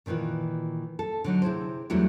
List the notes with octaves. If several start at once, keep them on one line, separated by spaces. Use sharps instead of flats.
A#2 D#3 E3 F4 B4
A4
D3 F#3 D#4
C3 E4 G#4 C5
E2 F#3 G3 A3 D4 E4